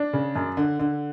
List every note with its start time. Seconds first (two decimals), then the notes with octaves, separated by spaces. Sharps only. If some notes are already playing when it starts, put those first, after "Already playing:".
Already playing: D4
0.13 C#3
0.36 F#2
0.57 D3
0.79 D3